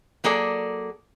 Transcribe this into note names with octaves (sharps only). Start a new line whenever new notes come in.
F#3 A#3 G#4 A4 D5